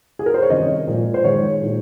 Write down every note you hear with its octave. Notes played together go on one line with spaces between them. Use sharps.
G#4
A#4
C5
C#5
C3 D#3 G3 C#4 D#5
A#2 F3 G#3
C5
D#3 G#3 D#4 C#5
A#2 G#3 D#4